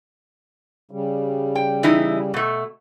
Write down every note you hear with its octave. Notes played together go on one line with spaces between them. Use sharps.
C#3 G3
G5
E3 D#4 E4
B2 A3